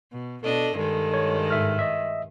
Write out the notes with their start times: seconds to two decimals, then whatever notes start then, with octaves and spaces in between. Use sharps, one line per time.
0.12 B2
0.43 B2 D4 A4 D#5
0.76 G2 D#3 G#3 A4
1.14 C#5
1.50 G#2 E5 F6
1.79 D#5 E5